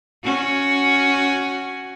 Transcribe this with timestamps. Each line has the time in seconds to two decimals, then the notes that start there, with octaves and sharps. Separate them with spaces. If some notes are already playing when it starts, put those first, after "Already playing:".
0.24 C#4 F#4